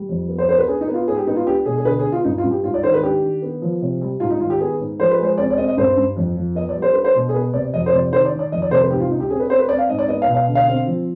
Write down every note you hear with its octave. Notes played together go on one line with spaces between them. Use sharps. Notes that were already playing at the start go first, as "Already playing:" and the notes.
Already playing: G3
F2
B3
C5
B3 C5
B4
D4 G#4
D#4
B3
F4
G#2 G#4
G4
B3 D#4
F4
D4 G4
B2 G#4
G#4
D3 B4
G#4
B3
F4
G2 D#4
F4
G2
G4
G#2 F4
D5
D#3 C5
B4
D4 G4
D#3
B3
F3
C3
G3
G#2 F4
D#4
D#3 F4
G4
B3 G#4
G#2
F3 C5
B4
G#3 C5
C4 D5
D5
C4 D#5
D#5
G2 C5
G2
F2
F3
B3 D#5
D5
G3
C5
D4 B4
C5
B2
G#4
B3 B4
C3 D5
F2 D#5
C5
C3 D5
D#3 C5
D5
D#3
D5
F2 D#5
D5
C3 C5
B4
G#2 G4
F4
D4 D#4
G4
C4 G#4
B4
C4 C5
B4
C4 D5
F5
G#2 D#5
D5
B3 D#5
F5
B2
F5
D3
F5
C4
F3